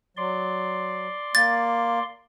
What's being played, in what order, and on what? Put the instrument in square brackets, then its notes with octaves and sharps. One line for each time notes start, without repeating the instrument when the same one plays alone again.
[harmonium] F#3 [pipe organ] D5 C6
[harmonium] A#3 [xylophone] A6